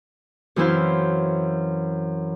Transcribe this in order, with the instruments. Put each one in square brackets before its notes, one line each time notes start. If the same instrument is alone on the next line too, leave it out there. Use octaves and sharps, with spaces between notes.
[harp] F#2 E3 C4 E4 C5 F5